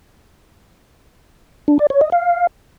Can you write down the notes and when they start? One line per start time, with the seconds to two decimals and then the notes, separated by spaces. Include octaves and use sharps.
1.68 D4
1.79 D5
1.90 C#5
2.01 D#5
2.12 F5